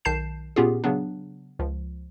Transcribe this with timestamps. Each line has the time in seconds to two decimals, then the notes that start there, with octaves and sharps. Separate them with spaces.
0.05 B1 D#3 A5 G6 C7 E7
0.56 A#2 B3 C#4 F4 G4 G#4
0.84 C#3 F#3 B3 D4
1.59 C#2 F3